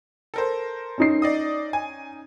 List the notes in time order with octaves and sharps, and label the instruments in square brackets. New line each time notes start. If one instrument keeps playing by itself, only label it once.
[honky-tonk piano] A4 A#4 C5
[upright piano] C#4 D#4 C7
[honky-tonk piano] D5 D#5 D#6
G#5